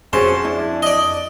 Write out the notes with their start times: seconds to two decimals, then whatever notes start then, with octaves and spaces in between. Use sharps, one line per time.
0.13 F2 C#4 F#4 G#4 C5 A5
0.45 D4 E4
0.83 D5 D#5